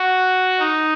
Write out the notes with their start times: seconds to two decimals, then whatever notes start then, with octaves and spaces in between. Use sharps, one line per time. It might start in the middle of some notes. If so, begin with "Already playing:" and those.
Already playing: F#4
0.59 D#4